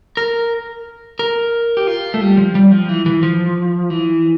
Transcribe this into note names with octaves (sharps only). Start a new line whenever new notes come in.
A#4
A#4
G4
F4
A3
G3
F3
G3
F3
E3
E3
F3
E3